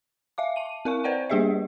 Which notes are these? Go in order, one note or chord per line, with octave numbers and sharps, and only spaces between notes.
E5 F5 D6
A5 D#7
C4 A#4 F5 C#6
B4 C5 D5 F#5 G5
G3 A#3 G4 G#4 D#5 E5